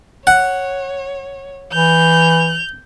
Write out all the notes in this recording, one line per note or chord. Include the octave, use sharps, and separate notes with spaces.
C#5 F#5
E3 G6 F7